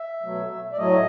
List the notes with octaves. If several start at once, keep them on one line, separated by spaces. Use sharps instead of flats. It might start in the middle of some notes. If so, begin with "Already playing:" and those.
Already playing: E5
B2 F#3 A3
D5
A2 F#3 A3 D#5